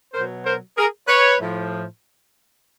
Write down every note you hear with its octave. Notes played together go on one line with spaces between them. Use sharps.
B2 F#3 A#4 C5
A#4 C5
G#4 A#4
B4 C#5
A2 F3